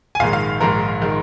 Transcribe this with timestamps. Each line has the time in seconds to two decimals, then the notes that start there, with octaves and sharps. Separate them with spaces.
0.15 G#5
0.19 A#1 G#2 D#3 G#3 F5
0.33 F5
0.60 A#1 G#2 D#3 G#3 A#4
1.02 D#3 G#3